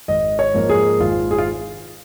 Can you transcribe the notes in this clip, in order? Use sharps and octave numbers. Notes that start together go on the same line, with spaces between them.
G#1 D#5
C#5
G#2 F3 A#3
G#4
G#1 F4
G#4
F4